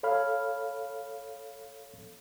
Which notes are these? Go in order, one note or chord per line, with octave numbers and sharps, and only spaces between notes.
A4 C#5 F5 B5 F6